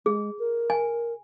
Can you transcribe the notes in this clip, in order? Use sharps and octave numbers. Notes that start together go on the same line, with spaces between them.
G#3 G#4
A#4
G#5